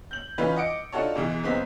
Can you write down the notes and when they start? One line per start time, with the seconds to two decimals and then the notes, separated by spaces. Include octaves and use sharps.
0.11 G6 F#7
0.38 E3 C#4 D#4 F4 B4
0.56 D#5 F#5 D6 C#7 D7
0.92 D4 D#4 F4 F#4 A4 C#5
1.15 G#2 B2 E3 G#3
1.43 F#1 C#3 B3 C4 D#4 B6